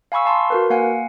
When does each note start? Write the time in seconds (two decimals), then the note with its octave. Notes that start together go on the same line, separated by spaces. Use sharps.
0.12 F5 G#5 B5 C#6 E6
0.25 F5 A5 C6
0.50 F#4 A#4 B4
0.70 A#3 F5 F#5 G#5